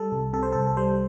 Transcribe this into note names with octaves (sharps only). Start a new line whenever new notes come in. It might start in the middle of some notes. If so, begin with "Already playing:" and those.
Already playing: G3 A4
C2
C3 A4
C5
C2 A4
A4
G3 C5